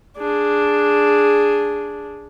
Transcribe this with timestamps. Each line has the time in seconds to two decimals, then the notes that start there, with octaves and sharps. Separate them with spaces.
0.18 D4 G#4